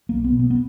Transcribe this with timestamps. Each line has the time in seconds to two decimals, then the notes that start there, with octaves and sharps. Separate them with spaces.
0.09 B1 A#3
0.24 B3
0.32 B2
0.39 B3
0.50 B3